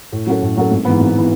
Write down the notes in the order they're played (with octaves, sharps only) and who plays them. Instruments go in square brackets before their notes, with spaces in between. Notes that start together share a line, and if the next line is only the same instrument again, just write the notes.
[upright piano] A2
F#3 C#4 F#4 A4
A2
F#3 C#4 F#4 A4
G#1
G#2 E3 B3
G#1
E3 B3